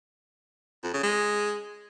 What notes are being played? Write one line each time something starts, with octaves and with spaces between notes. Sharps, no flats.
F2
C#3
G#3